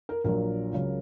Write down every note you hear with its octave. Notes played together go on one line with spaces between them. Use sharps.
A#4
A#1 A#2 F#3 A#4
C#2 C#3 F#3